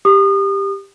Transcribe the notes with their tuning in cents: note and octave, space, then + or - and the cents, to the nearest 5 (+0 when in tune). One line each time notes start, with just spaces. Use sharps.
G4 +10 D#6 -35